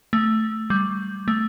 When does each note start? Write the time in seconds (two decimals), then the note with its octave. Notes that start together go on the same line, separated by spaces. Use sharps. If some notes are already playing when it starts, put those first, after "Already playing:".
0.13 A3
0.70 G3
1.28 A3